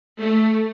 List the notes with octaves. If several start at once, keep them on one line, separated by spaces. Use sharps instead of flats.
A3